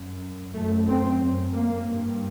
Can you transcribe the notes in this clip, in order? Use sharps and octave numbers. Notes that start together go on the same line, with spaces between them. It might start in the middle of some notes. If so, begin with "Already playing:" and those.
Already playing: F#2
F#2 A3
C4
F#2
A#3
G2